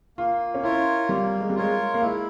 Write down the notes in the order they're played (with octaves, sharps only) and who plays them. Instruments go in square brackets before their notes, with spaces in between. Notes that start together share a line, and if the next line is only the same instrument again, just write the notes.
[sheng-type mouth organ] A#3 [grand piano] F4
[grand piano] C#4
[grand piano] E4 [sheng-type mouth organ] F4 A#4 C#5
[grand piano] G3 [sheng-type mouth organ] A#3
[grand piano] G#3
G3
[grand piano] G#3 [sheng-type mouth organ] F4 A#4 C#5
[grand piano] A#3
[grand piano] G#3 [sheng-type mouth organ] E4